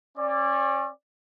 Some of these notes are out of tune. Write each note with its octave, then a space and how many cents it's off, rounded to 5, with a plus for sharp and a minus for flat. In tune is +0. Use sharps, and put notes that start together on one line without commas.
C#4 -35 D5 +0